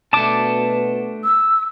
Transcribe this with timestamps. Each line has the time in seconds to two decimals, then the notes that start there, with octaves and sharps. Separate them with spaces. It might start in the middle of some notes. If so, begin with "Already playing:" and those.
0.13 B2 A3 B3 D4 A5 D6
1.24 E6